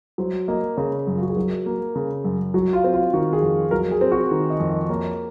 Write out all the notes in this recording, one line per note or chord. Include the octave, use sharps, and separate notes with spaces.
F#3 C5
A#3 D#5
C#3 C#5
F#2
F4
F#4
G#4
F#3 A#4
A#3
C#3
F#2
F#3 F#4
F4
C4
F4
D#3 F#4
G#4
F2
F#3 A#4
G#4
C4
F#4
D#3
D#5
F2
D#5
A#3 C#5